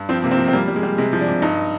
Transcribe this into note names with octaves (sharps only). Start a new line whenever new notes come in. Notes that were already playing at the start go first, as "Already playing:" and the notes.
Already playing: G2
F3 C4
C3 A#3
C4
F3
C4
G3 A#3
G3
G#3
G3
C3 G#3
F3
D4
C3
G2 D#4